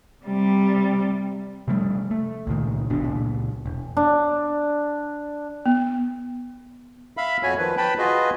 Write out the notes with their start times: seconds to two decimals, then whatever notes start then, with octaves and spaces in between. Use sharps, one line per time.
0.25 C3 G3
1.68 C3 F3 G3 A3
2.11 A3
2.47 C#2 A#2 D#3
2.90 G1 B2 D4
3.04 C#2 A#2
3.66 E1
3.97 D4
5.66 B3
7.17 E5 F5 B5
7.43 F2 F#4 C#5 G#5
7.58 D#3 F3 B4
7.77 B4 G5 A5 B5
7.98 F4 F#4 G#4 B4 D#5